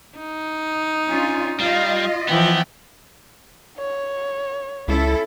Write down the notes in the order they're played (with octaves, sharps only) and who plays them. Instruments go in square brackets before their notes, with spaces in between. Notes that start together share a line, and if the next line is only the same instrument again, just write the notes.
[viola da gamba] D#4
[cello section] C#4 D4 F4 [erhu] G#5
[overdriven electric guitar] G3 [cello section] F4 D#5 [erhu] F5
[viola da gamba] E3 F3 [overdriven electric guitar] B3 [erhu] G5
[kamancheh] C#5
[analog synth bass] C#2 [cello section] C#4 E4 A4